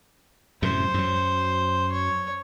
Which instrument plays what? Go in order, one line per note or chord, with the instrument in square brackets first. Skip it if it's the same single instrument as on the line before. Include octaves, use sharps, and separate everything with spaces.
[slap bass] F#2 A2 C3 [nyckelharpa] C5
[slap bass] F#2 F#3
[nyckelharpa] C#5